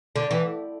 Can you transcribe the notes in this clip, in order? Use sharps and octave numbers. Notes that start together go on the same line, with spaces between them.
D3
E3